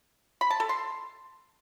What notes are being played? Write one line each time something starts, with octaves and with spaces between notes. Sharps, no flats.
B5
A5
A4
C6